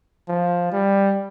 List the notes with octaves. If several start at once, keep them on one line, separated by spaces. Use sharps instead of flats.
F3
G3